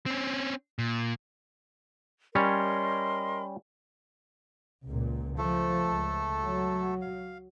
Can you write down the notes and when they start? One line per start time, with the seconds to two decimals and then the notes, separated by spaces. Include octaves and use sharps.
0.06 C4 C#4
0.79 A#2
2.35 G3 C#4 A#4 C#5 D#5 C6
4.85 C#2 A#2
5.38 F3 A3 A4
5.87 C#2
6.40 F#3
7.02 F5